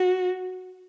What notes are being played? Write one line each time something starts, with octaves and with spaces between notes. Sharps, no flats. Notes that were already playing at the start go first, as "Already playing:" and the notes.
Already playing: F#4